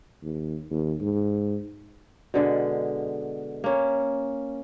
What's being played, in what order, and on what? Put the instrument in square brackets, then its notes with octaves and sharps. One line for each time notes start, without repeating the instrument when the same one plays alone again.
[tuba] D#2
D#2
G#2
[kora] B2 D3 G#3
A#3 C#4